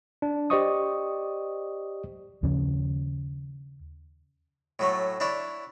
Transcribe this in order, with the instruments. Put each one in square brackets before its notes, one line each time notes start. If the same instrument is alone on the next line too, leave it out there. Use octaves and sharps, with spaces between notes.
[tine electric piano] D4
G4 C5 D5 D#5 C#6 D#6
[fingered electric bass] D#2 C#3 F3 C#4
[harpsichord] A2 F#3 A3
D4 E4 C#5 D5